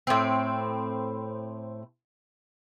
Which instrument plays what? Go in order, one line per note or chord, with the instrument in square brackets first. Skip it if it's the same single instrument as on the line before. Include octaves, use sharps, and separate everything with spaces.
[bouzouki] A2 C4